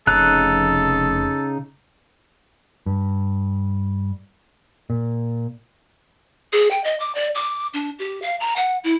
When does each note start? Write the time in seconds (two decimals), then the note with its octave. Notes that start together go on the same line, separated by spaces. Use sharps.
0.07 F1 C#3 D#4 A4 F#6
2.86 G2
4.90 A#2
6.53 G#4
6.71 G5
6.84 D#5
7.00 D6
7.15 D5
7.35 D6
7.74 D4
7.99 G4
8.22 F5
8.40 A#5
8.56 F#5
8.84 E4